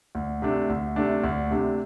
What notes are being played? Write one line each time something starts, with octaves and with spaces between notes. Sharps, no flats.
D2
C3 A3 D4
D2
C3 A3 D4
D2
C3 A3 D4